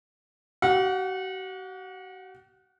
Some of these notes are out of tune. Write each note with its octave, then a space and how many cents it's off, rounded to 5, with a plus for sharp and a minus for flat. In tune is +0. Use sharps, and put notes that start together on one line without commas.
F#4 +45 F#5 -30